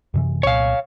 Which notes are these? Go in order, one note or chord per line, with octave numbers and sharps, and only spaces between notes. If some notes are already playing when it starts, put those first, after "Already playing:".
F#2 C3 E3
C2 A#2 C#5 F5